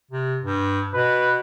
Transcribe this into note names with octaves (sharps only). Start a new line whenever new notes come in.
C3
G2
B2 B4